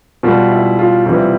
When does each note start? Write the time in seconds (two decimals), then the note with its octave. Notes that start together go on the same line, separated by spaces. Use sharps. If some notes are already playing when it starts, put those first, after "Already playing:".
0.23 B2 G3 F4
0.51 E4
0.79 F4
1.06 C3 E3 G3 F4